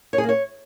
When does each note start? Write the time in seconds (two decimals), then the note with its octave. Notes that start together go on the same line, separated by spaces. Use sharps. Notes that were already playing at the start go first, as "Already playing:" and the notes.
0.13 C#5
0.18 G#4
0.23 A#3
0.29 C#5